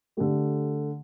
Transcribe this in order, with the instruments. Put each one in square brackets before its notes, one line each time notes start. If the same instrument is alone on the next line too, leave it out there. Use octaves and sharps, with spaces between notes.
[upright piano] D3 A3 G4